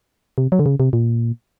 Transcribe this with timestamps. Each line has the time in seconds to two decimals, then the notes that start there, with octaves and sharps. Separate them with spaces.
0.38 C3
0.52 F#3
0.59 D3
0.66 C#3
0.80 C3
0.93 A#2